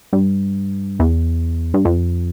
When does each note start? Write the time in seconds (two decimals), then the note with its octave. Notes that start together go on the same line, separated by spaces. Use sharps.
0.13 G2
1.00 E2
1.74 G2
1.85 F2